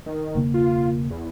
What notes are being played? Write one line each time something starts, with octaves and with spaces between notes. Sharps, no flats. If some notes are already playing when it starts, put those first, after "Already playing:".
D#3
E1 C#3 A#3
F4
E2